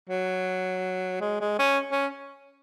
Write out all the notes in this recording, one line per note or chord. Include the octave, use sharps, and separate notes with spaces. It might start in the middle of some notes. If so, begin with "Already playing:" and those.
F#3
G#3
G#3
C#4
C#4